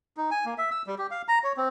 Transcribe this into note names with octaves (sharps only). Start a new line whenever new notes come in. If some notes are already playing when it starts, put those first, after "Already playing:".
D#4
G#5
A#3
E5
E6
G3
G4
F5
A#5
C#5
C4